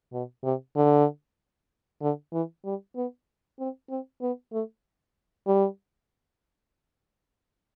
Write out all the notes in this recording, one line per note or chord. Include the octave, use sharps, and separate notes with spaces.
B2
C3
D3
D3
E3
G3
B3
C4
C4
B3
A3
G3